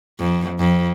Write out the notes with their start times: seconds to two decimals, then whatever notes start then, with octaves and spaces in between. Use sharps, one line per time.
0.19 F2
0.59 F2